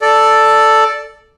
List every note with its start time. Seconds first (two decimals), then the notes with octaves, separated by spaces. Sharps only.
0.02 A4 D5